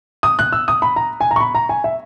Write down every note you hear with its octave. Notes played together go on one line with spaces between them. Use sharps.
D#6
F#6
E6
D#6
B5
A#5
G#5
A#5
C#6
B5
A#5
G#5
E5